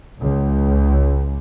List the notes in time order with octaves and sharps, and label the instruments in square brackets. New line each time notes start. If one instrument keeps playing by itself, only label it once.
[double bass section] C#2